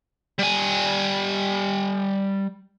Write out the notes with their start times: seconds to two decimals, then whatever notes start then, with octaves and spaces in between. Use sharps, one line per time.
0.39 G3 G#5